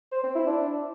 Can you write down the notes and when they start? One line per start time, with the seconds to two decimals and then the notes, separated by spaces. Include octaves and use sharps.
0.12 C5
0.24 C4
0.35 E4
0.47 D4